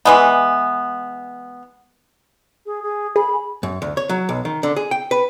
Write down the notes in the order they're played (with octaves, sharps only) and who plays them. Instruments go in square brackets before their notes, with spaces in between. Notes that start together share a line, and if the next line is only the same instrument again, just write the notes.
[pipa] E3 G#3 B3
[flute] G#4
G#4
[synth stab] G#4 [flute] B5
[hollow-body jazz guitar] F#2
D2
C#5
F#3
B1
D#3
D3
G#4
G5
B4